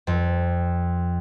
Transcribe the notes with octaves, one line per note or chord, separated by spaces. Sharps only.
F2